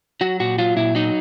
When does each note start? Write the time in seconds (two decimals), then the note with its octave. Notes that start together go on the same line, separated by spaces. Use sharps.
0.21 F#3 F#4
0.40 A#2 F#4
0.58 F#3 F4
0.76 A#2 E4
0.95 F#3 D#4